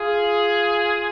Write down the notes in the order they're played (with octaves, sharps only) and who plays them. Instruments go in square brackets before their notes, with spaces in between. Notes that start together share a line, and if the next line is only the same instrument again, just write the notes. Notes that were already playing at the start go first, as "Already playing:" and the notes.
Already playing: [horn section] F4 G#4